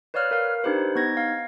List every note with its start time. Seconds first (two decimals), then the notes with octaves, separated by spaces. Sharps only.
0.14 B4 C#5 D5 F5 F6 F#6
0.31 A#4 F5
0.64 D4 D#4 G4 B4 C5
0.95 B3 D#4 G#6 A#6
1.17 F5